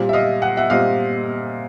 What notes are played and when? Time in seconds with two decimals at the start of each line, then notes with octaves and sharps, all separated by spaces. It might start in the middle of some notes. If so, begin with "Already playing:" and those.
Already playing: A#2 G3 C4
0.09 E5
0.13 D#5 F5
0.42 F#5
0.57 E5 F#5
0.70 A#2 G3 C4 D#5 F5